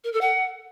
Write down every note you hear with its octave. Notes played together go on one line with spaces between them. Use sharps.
A#4
A4
F#5